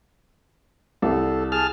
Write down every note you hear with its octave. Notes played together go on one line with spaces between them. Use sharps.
C2 A4
G#4 A5 F6